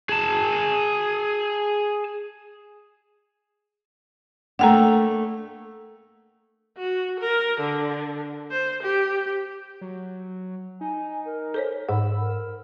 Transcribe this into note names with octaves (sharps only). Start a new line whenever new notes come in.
G#4 A5
A3 A#3 D4 F#5 G5 A#5
F#4
A#4
D3
C5
G4
F#3
D#4 G#5
A#4
A4 C5 C#5
G#2 F#5 B5 E6
A#4